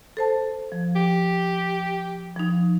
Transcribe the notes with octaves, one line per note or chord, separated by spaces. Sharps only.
A4 C5 A5
F3
G4
F3 D#4